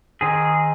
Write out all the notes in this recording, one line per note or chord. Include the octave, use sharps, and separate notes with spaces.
D#3 C4 G#4